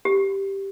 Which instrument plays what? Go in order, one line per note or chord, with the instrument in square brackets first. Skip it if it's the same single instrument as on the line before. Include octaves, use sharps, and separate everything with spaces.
[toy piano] G4